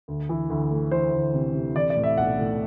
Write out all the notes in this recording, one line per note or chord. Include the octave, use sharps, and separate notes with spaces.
D2
E3
D2
A3
E3 C5
D2
C3
C3
E3 D5
D5
A2
E5
B1 F#5
A2